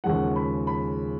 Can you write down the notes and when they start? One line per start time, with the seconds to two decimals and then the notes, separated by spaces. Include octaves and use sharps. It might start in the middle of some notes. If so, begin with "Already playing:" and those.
0.04 D#2 C#3 F3 G#3 F#5
0.36 B5
0.67 B5